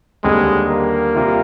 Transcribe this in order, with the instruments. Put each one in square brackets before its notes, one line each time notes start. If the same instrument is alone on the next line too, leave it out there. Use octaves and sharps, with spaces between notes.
[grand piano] D#2 D3 G3 C4 [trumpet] G#3
[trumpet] A#3
[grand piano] C3 G3 C4 F4